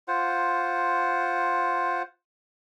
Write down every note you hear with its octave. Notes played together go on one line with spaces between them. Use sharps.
F4 C5 F#5